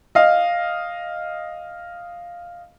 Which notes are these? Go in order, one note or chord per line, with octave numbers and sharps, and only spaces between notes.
D#5 F5